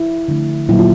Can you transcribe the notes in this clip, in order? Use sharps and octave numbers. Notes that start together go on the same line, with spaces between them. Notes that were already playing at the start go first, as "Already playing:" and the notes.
Already playing: E4
D3 F3 A3
A#2 F#3 A#3 E4
F4